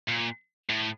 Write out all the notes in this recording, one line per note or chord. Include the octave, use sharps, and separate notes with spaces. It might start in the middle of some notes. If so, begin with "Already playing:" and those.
A#2
A2